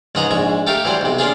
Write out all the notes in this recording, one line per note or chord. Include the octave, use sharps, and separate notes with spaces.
C#2 G#2 G#4 D#5 F#5 A#5
A#1 G#2 C#6
A3 G4 A4 A#4 F5
E3 F#3 G3 C5
B1 C3
A#3 C#4 D4 F4 G#4